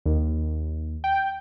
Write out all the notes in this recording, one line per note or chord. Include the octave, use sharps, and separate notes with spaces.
D#2
G5